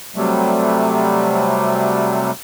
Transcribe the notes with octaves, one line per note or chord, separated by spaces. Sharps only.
C3 F#3 G3 A3